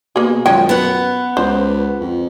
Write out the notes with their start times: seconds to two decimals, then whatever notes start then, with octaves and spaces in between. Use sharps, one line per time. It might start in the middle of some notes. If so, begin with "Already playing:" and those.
0.16 B2 A#3 G#4
0.46 F#2 D#3 F3 G#3 C#5 G5
0.69 B3 F#5
1.37 C#2 C5
2.00 F2